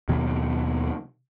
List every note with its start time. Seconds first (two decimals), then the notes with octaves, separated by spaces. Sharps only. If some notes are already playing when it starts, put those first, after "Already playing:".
0.09 D#2 B2 D#3 F#3